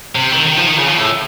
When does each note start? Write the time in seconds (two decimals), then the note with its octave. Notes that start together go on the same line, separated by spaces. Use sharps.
0.15 C3
0.32 D#3
0.46 D#3
0.57 F3
0.67 D#3
0.78 C#3
0.88 F3
0.98 A2